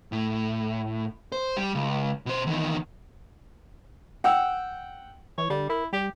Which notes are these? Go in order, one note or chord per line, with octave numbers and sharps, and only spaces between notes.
A2
C5
G3
C#2
B2 C5
E2 D#3
F#5 G5 E6
E3 C#5
D3 G3
E4 A#4
G3 G4